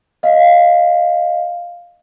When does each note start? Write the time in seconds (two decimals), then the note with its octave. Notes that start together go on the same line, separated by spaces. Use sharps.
0.23 D#5 F5